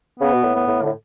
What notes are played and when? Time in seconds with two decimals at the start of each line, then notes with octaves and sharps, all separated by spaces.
0.20 C#3 B3
0.33 B2
0.44 A2
0.55 B3
0.68 A2
0.82 D3
0.85 A2